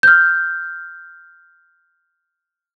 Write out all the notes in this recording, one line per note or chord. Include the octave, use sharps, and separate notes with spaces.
F6 G6